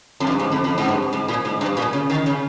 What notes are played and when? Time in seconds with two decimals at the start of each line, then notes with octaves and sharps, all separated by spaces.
0.20 F2
0.27 G2
0.40 G#2
0.52 F2
0.64 F2
0.78 G#2
0.88 G2
1.13 G#2
1.28 A#2
1.45 G#2
1.61 G2
1.77 A#2
1.93 C#3
2.10 D#3
2.26 C#3